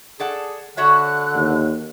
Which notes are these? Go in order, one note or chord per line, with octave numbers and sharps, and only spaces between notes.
G#4 A4 D5 F#5
D3 F#4 C#5 E5 F#6
D#2